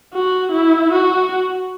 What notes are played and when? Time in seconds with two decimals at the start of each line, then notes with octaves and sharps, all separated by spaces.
0.14 F#4
0.52 E4
0.93 F#4